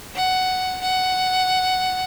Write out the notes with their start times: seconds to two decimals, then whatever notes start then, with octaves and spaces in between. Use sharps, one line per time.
0.16 F#5
0.82 F#5